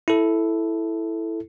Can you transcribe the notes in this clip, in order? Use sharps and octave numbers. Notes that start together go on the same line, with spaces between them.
E4 A4